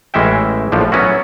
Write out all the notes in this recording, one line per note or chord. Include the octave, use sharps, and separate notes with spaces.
A1 E3 G#3 C#4 E5 G5
A#1 A2 F3 D4
F#3 B3 C#4 E4 F#4